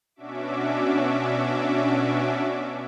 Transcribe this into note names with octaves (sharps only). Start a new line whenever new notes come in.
B2 C#4 D4 F#4 E5 D6